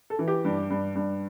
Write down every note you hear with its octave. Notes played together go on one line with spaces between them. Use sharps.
A4
E3
G4
G2
G2
G2